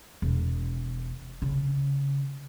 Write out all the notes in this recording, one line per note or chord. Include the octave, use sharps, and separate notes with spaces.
E1
C#3